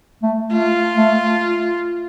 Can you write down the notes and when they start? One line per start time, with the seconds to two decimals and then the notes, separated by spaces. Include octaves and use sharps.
0.23 A3
0.52 A3 F4
0.97 A3